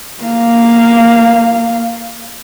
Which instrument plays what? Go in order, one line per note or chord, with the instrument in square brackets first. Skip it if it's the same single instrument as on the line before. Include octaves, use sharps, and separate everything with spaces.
[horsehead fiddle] A#3 F5